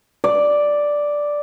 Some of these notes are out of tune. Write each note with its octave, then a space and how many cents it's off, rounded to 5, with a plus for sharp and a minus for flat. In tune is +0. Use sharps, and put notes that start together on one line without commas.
D5 +0